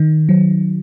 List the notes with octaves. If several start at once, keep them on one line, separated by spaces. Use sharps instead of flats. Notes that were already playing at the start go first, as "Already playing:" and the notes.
Already playing: D#3
F#3